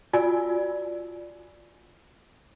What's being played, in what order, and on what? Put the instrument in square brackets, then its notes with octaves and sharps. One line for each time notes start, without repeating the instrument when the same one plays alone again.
[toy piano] F4 F#4 D5 G#5 E6